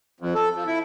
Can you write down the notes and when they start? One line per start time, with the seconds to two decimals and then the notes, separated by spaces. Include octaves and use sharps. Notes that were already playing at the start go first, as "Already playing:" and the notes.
0.20 F2
0.35 A4
0.55 F3
0.67 E4